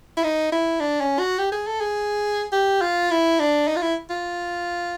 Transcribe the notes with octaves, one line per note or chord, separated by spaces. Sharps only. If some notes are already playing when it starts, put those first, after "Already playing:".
E4
D#4
E4
D4
C#4
F#4
G4
G#4
A4
G#4
G4
F4
E4
D4
D#4
F4
E4
F4